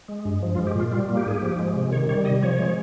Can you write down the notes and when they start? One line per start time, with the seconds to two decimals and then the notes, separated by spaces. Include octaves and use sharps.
0.08 G#3
0.25 G2
0.43 F3
0.55 F4
0.59 G#3
0.67 G4
0.75 A#2 F4
0.92 G3 F4
1.09 A#3
1.17 G4
1.26 G#2 G#4
1.38 F3 G4
1.59 G#3
1.76 C3
1.92 D#3 C#5
2.09 G3 C#5
2.25 C3 D#5
2.42 F3 C#5
2.59 G#3